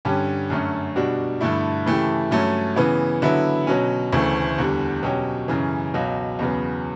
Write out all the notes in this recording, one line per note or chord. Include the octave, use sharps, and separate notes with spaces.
G2 D3 G3 C#4 G4
F#2 D3 A3 C#4
B2 G3 D4 F#4
G2 D3 A3 E4
C#3 E3 A3 E4 G4
G2 F#3 A3 C#4
C#3 E3 B3
D3 F#3 B3 E4
B2 F#3 C#4
D2 C#3 E3 A3
E2 D3 G3
B2 F#3 C#4 G4
F#2 C#3 E3
C#2 B2 F#3
E2 C#3 F#3 B3